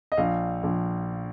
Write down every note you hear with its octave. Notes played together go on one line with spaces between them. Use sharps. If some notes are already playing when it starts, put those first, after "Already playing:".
D#5
A#1 F5
A#1